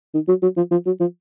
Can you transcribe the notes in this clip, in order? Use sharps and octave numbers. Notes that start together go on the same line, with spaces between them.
D#3
F#3
F#3
F3
F3
F#3
F3